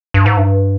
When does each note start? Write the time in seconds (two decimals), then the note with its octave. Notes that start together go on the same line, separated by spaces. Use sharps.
0.14 G2
0.26 G#2
0.37 G2